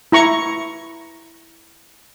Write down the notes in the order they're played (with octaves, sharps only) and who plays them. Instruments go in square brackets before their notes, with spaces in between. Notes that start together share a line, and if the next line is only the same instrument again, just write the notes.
[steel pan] E4 A#5 C#6